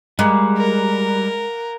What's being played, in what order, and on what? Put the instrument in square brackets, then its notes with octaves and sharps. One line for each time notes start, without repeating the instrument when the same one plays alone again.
[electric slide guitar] G3 [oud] G#3 [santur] A#3 F#5
[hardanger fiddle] A#4